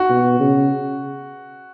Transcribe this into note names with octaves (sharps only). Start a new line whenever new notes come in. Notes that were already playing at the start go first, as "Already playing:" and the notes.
Already playing: F#4
B2
C#3